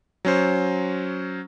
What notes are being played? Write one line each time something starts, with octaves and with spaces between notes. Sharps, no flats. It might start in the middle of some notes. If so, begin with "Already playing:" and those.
F#3 C#4 C5